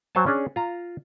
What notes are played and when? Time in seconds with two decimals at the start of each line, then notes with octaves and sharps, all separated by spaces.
0.15 F#3 C5 C#5 G#5 A5
0.26 C#4 D4 G#4
0.56 F4 A#5